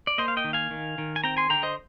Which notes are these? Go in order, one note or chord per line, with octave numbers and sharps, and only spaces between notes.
D5
A#3 C5 D#5
F5
D#5 G5
D#3
F5 G#5
D#3
D#3
G#5
C4 G5 A#5
G#5 C6
D3 G5 A#5
C5 D#5